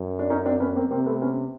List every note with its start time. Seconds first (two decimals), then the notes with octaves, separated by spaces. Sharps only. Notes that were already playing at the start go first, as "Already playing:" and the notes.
Already playing: F#2
0.19 D4
0.30 C#4 D#4
0.45 C4 D4
0.60 B3 C#4
0.76 A#3 C4
0.91 C3 A#3 C4
1.06 A3 B3
1.22 B3 C#4